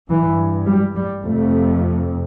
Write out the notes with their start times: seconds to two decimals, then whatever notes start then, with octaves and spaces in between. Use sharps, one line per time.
0.10 G2 E3
0.67 G3
0.97 G3
1.25 F2 C3 A3